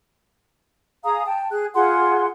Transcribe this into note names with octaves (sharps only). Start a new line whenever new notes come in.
G#4 F5 A#5 D#6
G5 A5
G#4 F#6
F4 G#4 F#5 C6